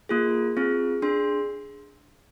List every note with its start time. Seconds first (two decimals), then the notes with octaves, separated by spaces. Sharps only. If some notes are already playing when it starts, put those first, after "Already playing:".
0.09 A#3 F4 G#4
0.57 C4 F4 G#4
1.02 D4 G#4 C6